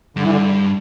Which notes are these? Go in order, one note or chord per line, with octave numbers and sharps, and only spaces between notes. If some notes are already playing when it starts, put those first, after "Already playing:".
G2 D3
E3
D3